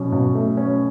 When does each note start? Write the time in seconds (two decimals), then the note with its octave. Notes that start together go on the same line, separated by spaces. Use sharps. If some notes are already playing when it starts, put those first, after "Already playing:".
Already playing: B2 F#3 C#4
0.12 B2
0.35 A3
0.57 C#4